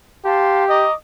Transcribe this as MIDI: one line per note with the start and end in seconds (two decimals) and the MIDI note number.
0.25 0.87 67
0.25 0.65 77
0.25 0.65 81
0.25 0.65 84
0.69 0.94 75
0.69 0.93 82
0.69 0.93 86